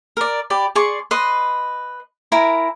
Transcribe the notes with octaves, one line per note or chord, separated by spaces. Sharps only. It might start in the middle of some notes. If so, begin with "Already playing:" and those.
A#4 D5
G4 D5 B5
G#4 D5 C6 C#6
B4 D#5 C6
E4 A#4 G#5 A#5